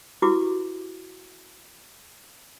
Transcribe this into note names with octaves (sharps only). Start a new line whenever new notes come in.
E4 F#4 G4 B4 D6